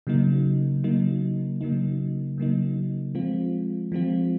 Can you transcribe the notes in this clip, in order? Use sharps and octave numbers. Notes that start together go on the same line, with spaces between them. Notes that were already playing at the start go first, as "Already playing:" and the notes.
C#3 F#3 A#3 D#4
C#3 F#3 A#3 D#4
C#3 F#3 A#3 D#4
C#3 F#3 A#3 D#4
F3 G#3 C4 F4
F3 G#3 C4 F4